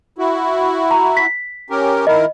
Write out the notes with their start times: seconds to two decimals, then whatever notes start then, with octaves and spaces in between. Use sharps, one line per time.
0.18 E4 F#4
0.91 A#5
1.17 B6
1.70 C#4 G4 A#4
2.07 D#3 E4 A#4 D#5